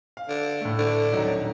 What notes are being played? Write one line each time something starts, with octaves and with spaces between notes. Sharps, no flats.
F5
D3
A2 A3
D3
D#1 F#3 D#4